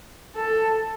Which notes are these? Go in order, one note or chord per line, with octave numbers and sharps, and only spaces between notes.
A4